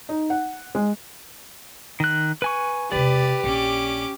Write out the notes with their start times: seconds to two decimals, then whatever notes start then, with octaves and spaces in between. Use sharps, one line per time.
0.09 D#4
0.30 F#5
0.75 G#3
2.00 D#3 F#6
2.42 B4 G#5 C#6
2.92 E1 C3 G4 B4 D5
3.44 A#1 C#4 D6